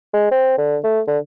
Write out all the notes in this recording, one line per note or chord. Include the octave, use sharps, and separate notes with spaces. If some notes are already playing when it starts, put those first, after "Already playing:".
G#3
C4
D3
A3
D3